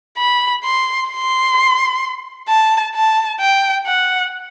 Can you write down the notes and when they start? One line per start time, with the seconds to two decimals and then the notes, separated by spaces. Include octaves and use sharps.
0.18 B5
0.64 C6
1.10 C6
2.48 A5
2.95 A5
3.40 G5
3.87 F#5